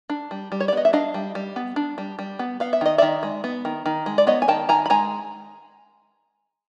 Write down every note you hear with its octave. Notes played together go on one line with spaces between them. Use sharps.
D4
G3
G3
C#5
D5
B3 D#5
E5
D4 D#5 F5
G3
G3
B3
D4
G3
G3
B3
B3 F5
E5
D#3 D#5
D#3 D5 E5
G#3
B3
D#3
D#3
G#3
D5
B3 C#5 D#5
G#5
D#3 G5 A5
D#3 G#5 A#5
B5
G#3 G#5 A#5